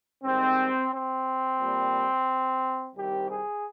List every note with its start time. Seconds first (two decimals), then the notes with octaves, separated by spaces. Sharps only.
0.24 G#2 D#3 G3 C4
0.92 C4
1.59 A#2 G3 A#3
2.94 C2 C3 D#3 G3 C4 G4
3.28 G#4